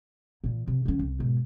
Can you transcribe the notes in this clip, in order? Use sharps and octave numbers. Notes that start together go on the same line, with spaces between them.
A#2 E3
C3
D3 C#4
C2
G#2 B2